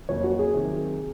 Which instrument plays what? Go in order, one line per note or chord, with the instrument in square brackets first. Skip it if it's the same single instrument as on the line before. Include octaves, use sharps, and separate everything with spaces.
[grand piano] F2 C3 F#3 A#3 C#4 [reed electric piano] C#5
[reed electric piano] F#4
G#4
[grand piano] C3 D#3 F#3